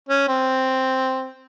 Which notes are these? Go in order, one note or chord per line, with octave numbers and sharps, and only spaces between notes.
C#4
C4